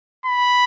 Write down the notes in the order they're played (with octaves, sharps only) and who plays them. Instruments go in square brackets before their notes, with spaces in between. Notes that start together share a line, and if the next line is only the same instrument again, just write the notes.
[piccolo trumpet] B5